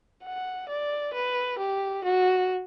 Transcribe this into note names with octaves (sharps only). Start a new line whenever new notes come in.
F#5
D5
B4
G4
F#4